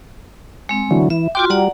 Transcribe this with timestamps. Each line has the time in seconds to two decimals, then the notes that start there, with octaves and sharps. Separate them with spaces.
0.69 G#3 C4
0.91 D3 E3 F#3
1.10 E3 E5
1.35 F4 F#4 G5 C6 D6
1.50 G3 D5 F#5 A#5